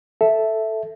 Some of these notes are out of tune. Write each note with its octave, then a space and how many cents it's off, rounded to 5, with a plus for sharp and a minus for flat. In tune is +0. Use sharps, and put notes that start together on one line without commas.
A4 +0 E5 +0